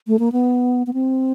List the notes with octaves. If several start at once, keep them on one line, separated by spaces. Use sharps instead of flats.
A3
A#3
B3
B3
C4